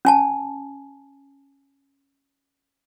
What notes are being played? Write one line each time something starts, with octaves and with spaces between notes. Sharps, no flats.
C#4 G#5 A5